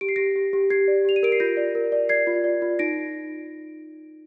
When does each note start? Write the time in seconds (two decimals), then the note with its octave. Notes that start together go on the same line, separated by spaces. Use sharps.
0.01 G4 D7
0.09 C7
0.16 G4 A#6 D7
0.36 G4
0.53 G4
0.70 G4 G#6 C7
0.88 D5
1.05 G4 F7
1.16 D#7
1.23 A#4 D7
1.32 C7
1.40 F4 G6 A#6
1.57 D5
1.75 A#4
1.92 D5
2.09 D5 G#6 C7
2.27 F4
2.44 D5
2.62 F4
2.79 D#4 A#6 D7